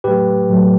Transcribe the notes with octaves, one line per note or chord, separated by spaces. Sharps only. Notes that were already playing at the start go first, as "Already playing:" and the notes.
A2 F#3 A3 G4 B4
A2 F#3 A3